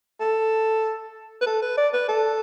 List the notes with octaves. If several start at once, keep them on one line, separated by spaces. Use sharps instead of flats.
A4
B4
A4
B4
D5
B4
A4